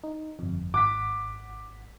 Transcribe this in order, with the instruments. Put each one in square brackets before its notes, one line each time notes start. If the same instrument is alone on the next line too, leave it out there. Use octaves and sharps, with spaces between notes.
[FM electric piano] D#4
G1 F2
[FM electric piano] G#1 F#5 B6 [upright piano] D6